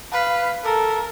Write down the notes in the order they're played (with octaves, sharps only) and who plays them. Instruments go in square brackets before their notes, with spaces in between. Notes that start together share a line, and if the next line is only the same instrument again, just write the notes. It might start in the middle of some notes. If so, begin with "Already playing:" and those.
[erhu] B4 [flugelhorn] F5
[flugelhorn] A4 [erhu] A#4